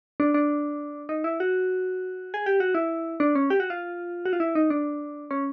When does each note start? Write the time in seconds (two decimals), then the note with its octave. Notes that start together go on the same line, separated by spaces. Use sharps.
0.20 D4
0.34 D4
1.09 D#4
1.24 E4
1.40 F#4
2.34 G#4
2.46 G4
2.60 F#4
2.75 E4
3.20 D4
3.35 C#4
3.50 G4
3.60 F#4
3.70 F4
4.25 F#4
4.33 F4
4.40 E4
4.55 D#4
4.70 D4
5.31 C#4